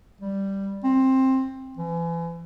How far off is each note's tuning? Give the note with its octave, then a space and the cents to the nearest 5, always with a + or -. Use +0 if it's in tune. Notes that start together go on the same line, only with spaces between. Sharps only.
G3 +0
C4 +15
E3 +35